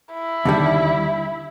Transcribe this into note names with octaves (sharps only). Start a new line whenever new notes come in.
E4
D#2 D3 G3